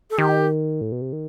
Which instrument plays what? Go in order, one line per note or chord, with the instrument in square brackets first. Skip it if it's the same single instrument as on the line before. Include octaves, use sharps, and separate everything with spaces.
[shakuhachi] A4
[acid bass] D#3 [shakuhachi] G4
[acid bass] A2
B2
C3
D#3